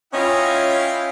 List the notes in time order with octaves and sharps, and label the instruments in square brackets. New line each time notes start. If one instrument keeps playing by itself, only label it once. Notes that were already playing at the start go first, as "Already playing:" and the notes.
[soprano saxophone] C#4 [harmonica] E4 F5 G5 [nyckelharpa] F4 [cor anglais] D#5